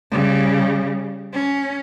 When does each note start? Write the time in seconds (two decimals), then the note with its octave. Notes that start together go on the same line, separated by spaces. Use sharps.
0.11 C#3 G3
1.34 C#4